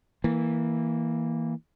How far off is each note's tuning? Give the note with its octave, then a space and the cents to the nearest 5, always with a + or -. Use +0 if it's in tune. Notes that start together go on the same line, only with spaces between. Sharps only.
E3 -15 A#3 +0